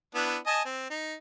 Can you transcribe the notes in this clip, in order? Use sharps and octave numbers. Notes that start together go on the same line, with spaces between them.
B3 D4 E4
D#5 G#5 A5
C4
D#4